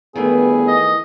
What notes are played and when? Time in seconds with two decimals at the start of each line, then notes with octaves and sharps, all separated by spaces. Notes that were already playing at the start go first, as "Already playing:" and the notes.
0.15 E2 G2 D#3 E3 A3 B3 G#4
0.68 D#5